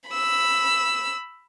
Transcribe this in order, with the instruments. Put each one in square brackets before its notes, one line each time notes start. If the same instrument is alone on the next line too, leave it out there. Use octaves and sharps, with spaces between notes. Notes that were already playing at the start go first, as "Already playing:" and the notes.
[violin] B5 E6